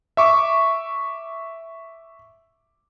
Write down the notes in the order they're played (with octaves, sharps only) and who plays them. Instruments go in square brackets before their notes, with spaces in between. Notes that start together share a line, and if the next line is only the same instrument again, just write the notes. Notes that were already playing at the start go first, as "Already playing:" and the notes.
[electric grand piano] E5 C#6 D6